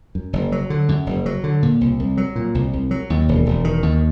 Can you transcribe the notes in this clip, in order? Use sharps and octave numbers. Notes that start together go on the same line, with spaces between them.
F#2
F#1
F#3
D3
F#2
F#1
F#3
D3
A#2
C2
C2
F#3
A#2
C2
C2
F#3
D#2
E1
E1
D#3
D#2